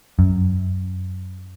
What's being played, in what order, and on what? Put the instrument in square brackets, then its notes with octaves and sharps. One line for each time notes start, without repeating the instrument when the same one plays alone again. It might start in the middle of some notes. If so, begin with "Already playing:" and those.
[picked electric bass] F#2